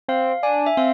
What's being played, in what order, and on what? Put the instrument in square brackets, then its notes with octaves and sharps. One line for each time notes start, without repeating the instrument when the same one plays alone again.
[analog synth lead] C4 [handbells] F5
[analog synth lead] D4 [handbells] G#5
[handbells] E5
[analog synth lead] C4 [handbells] F5